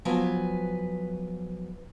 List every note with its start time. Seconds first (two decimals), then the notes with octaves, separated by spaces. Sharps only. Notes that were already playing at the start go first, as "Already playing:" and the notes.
0.05 F3 F#3 B3 B4 G#5